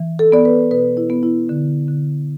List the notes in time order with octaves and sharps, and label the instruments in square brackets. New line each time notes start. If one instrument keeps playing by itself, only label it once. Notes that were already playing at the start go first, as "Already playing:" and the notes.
Already playing: [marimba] E3
A4
B3 D5
B4
B2 B4
E4
B3
E4
D3
D3